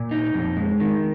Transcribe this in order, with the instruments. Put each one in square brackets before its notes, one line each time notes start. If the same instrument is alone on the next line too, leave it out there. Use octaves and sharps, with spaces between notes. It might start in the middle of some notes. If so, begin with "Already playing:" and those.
Already playing: [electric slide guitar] A#2
D#4
F2
G#3
D#3